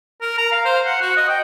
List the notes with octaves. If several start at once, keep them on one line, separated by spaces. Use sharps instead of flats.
A#4
A#5
F5
C5
F#5
F#4
D#5
G5